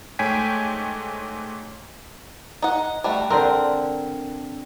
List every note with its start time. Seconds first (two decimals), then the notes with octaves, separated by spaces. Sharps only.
0.19 G#2 A3 C#5 G5 G#5 B6
2.62 D#4 F#5
3.04 G3 A3 F#4
3.30 D3 C4 A#4